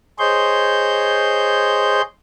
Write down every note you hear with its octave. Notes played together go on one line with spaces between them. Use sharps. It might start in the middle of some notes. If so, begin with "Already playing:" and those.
G#4 C5 C#5 D#5 C6 G6